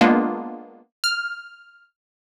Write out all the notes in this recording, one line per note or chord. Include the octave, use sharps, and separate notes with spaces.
G#3 A#3 B3 D4 F4
F6